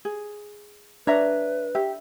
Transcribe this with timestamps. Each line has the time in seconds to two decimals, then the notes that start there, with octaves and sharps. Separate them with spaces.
0.05 G#4
1.07 D4 B4 C#5 E5 A#5
1.75 G4 E5